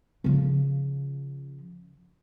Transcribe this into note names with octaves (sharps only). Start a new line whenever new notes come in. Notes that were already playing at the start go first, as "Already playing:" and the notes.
C#3 F3